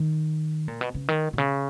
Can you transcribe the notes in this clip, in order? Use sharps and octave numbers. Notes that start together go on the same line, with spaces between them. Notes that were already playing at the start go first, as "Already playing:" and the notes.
Already playing: D#3
A#2
B2
C#3
D#3
B2
C#3